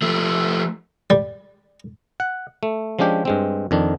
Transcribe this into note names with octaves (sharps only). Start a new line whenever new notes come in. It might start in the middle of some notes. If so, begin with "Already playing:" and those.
F3 A3
G3
F#5
A3
F3 G#3 C#4 D4 G4
G2 G#3 C4
F2 D#3 D4